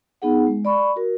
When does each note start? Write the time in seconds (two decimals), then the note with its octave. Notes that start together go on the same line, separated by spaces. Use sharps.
0.22 B3 D#4 G#4 F#5
0.47 G#3
0.65 D5 B5 C#6
0.96 F#4 A#4